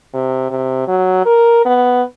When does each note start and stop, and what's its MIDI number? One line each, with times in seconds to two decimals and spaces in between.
0.14 0.49 48
0.50 0.87 48
0.88 1.26 54
1.26 1.62 70
1.65 2.03 59